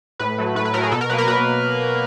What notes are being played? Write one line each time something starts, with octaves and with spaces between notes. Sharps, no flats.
A2 B4
F#3 A3
A2 B4
B4
F#3 A3 A#4
G#4
B2 A4
A#4
F#3 A#3 B4
A#4
B2 B4